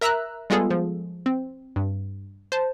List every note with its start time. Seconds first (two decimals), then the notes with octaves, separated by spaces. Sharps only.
0.01 A#4 E5 A#5 E6 F#6
0.50 G3 G#3 B3 F4 G#4 A4
0.70 F3
1.26 C4
1.76 G2
2.52 C5 A5